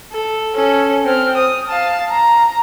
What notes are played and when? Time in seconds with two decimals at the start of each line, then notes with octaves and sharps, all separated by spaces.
0.12 A4
0.55 C#4 A4
1.05 C4 F6
1.37 D#6
1.69 F5 A5
2.10 A#5